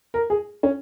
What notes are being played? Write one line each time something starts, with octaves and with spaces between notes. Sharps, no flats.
A#4
G#4
C#4